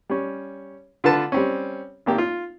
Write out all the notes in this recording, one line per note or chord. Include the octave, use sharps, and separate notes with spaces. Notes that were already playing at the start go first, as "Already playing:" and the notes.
G3 C#4
D3 F4 A4 B4 A5
G3 C4 C#4
G#1 A#3 G4
F4